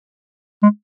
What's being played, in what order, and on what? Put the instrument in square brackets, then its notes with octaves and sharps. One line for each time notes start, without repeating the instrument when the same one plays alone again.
[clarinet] G#3